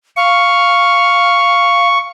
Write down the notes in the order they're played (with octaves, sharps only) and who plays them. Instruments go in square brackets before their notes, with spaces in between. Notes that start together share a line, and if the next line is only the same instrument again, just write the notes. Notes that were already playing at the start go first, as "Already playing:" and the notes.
[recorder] F5 [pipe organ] C#6